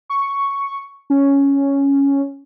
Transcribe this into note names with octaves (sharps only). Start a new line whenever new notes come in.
C#6
C#4